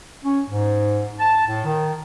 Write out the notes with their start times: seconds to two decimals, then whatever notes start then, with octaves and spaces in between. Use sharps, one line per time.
0.25 C#4
0.48 G#2
1.19 A5
1.47 A2
1.65 D#3